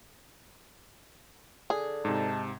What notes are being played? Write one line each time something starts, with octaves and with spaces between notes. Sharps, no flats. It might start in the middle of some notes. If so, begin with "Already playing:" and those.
D3 G#4
G#2 C3 D#4 A5